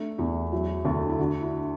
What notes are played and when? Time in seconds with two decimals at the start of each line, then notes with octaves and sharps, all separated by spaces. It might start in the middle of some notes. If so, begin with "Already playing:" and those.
Already playing: A3 D4
0.18 E2 E4
0.52 F#3 E4
0.85 D2 A4
1.09 E4
1.18 D3 F#4
1.41 E4